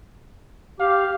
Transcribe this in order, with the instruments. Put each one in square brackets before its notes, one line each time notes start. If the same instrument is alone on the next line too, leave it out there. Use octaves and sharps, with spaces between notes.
[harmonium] G4 [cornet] F5